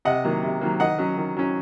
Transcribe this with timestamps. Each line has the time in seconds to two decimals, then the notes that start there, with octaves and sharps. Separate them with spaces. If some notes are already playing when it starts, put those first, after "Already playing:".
0.05 C3 D#5 F#5
0.24 D#3 F#3 A#3
0.43 C3
0.61 D#3 F#3 A#3
0.80 D#3 D#5 F#5
0.98 F#3 C#4
1.17 D#3
1.37 F#3 C#4